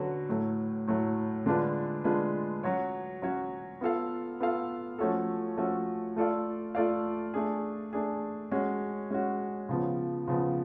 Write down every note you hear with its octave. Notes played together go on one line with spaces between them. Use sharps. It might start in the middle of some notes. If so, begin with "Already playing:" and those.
Already playing: D3 F#3 C#4 F#4 B4
A2 F#3 A3
A2 F#3 A3
D3 G#3 D4 F4 B4
D3 G#3 D4 F4 B4
F#3 C#4 F#4 C#5
F#3 C#4 F#4 C#5
B3 F4 A4 F5
B3 F4 A4 F5
F3 A3 C#4 F#4 A4
F3 A3 C#4 F#4 A4
A3 F4 A4 D5 F5
A3 F4 A4 D5 F5
A3 D4 G#4
A3 D4 G#4
G#3 C#4 F#4
G#3 C#4 F#4
C#3 F3 B3
C#3 F3 B3